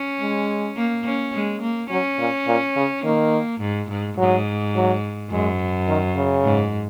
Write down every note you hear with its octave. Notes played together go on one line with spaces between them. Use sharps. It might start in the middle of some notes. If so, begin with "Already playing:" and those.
Already playing: C#4
G#3
A#3
C#4
G#3
A#3
F#3 C#4
A#2
A#2
C#3
D#3 A#3
G#2
G#2
G#2 F#3
F#3
F#2 G#3
D#3
C#3
G#2